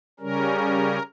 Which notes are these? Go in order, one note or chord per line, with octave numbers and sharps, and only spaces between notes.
C#3 G3 C#4 A#4